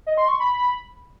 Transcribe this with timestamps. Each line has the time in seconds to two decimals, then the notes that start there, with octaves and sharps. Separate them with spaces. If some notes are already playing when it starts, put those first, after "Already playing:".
0.07 D#5
0.17 C6
0.28 C#6
0.39 B5